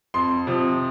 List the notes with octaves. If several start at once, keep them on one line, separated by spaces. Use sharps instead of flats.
F2 C6
C3 F3